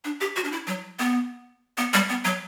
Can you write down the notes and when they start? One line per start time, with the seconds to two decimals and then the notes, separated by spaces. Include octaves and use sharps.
0.04 D4
0.21 G4
0.36 F#4
0.44 D4
0.52 E4
0.67 F#3
0.99 B3
1.77 B3
1.93 G3
2.09 B3
2.24 F#3